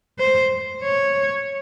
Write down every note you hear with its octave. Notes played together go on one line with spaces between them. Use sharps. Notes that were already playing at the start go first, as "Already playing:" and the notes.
C5
C#5